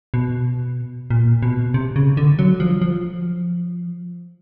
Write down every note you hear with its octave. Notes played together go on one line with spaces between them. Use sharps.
B2
A#2
B2
C3
C#3
D3
F#3
F3
F3